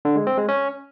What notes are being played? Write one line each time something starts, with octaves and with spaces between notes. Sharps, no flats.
D3
G#3
C4
G#3
C#4